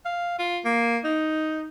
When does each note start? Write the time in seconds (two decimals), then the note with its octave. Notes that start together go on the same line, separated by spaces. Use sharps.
0.05 F5
0.39 F4
0.65 A#3
1.04 D#4